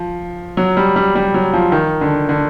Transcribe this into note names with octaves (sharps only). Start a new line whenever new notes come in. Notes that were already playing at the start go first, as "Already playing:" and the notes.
Already playing: F3
F#3
G3
G3
G3
F#3
F3
D#3
D3
D3